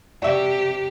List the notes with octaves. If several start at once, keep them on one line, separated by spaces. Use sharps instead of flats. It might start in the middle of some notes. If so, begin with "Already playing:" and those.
C3 F#4 G4 D5 E5